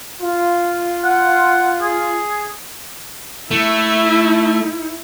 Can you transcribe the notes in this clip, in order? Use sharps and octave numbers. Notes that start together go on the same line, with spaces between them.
F4
F#5
G#4
A3 E4